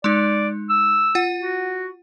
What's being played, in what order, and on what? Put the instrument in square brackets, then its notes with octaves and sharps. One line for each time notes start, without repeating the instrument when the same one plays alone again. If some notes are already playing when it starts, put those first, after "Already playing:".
[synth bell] G#3 D#4 [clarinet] D5
[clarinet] E6
[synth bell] F4 F#5
[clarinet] F#4